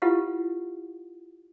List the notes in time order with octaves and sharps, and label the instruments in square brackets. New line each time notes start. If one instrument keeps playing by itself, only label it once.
[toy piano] E4 F4 G4 B4 F5 F#5